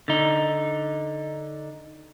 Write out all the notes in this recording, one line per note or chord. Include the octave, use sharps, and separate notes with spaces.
D3 D#4